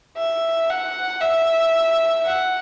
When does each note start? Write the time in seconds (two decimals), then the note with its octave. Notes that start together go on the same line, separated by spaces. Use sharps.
0.17 E5
0.70 F#5
1.22 E5
2.25 F#5